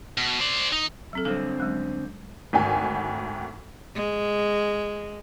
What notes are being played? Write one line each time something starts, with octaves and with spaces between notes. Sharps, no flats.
B2
C5 D5
D#4
F#3 C4 A4
D3 G3 C4 A4
F#3 G#3 C#4
G#1 D2 G5 G#5
G#3